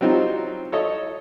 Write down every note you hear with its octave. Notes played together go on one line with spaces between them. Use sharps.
F#3 G3 C4 D#4 F4
A4 C#5 D#5